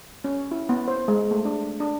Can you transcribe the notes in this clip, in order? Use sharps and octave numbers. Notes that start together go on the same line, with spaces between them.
C#4
E4
B3
C5
G#3
A3
D4
D4